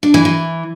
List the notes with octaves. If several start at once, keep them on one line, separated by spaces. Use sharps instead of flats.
D4
E3
E3